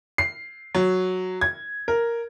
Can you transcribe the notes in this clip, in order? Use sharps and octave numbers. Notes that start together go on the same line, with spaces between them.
C7
F#3
G#6
A#4